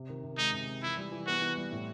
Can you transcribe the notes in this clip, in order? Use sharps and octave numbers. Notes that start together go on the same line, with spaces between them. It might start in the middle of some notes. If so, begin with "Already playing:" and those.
Already playing: C3
D#3
C3
G#3 D#4
C3
D#3
E3 E4
G3
E3
B3 F#4
E3
G3
A2